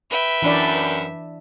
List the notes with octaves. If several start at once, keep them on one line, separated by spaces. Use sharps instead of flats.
B4 E5 G5
F#2 E3 D4 D5